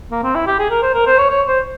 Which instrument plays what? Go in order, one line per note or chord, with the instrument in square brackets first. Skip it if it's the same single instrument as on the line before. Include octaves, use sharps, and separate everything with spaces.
[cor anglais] A#3
C4
E4
G4
G#4
A#4
C5
A#4
C5
C#5
C#5
C5